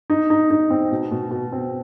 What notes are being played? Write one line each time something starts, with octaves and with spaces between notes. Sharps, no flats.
D#4
D#4
D#4
C4
B2
B2
B2
C4